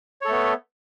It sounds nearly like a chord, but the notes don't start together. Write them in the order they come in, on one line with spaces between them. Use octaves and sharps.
C#5 A4 A3 B3